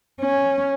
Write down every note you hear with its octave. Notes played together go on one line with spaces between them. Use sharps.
C#4